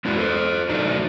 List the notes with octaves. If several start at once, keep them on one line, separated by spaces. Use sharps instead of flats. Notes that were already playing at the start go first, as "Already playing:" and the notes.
G#3 B3 D4 E4 F#4
A4 C5
F#3 A3 D4 D#4